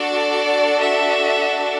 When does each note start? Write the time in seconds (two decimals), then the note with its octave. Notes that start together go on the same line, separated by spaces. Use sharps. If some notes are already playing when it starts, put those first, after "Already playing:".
Already playing: D4 F#4 A4 D5
0.80 E5